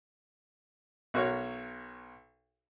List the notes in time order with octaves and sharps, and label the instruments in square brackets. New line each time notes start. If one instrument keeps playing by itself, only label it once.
[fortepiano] B1 F#4 A#4 C#5